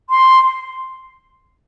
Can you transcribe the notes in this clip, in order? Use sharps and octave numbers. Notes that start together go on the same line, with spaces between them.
C6